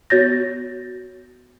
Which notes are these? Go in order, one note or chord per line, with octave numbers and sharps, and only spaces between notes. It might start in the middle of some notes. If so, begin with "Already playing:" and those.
B3 F#4 C#5 G6 A6 A#6